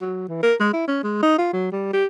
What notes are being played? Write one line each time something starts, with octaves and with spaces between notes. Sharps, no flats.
F#3
E3
A#4
G#3
E4
C#4
G#3
D#4
F4
F#3
G3
G4